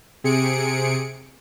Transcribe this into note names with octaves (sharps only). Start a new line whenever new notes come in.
C3 G#4 C#7 D7